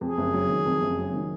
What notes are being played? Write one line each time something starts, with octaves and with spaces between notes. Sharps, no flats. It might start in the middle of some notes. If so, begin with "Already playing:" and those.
F2 G#4
F#1
F#3
D#3
F2
F#1
F#3
D#3